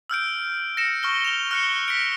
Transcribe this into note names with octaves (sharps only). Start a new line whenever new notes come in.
E6 F6 G6 D7
A#6 C#7 E7
C#6 F6 G7
F7 G7
F6 F#6 C#7
B6 D7